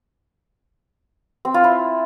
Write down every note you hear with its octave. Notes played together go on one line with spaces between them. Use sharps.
C4
F4
E4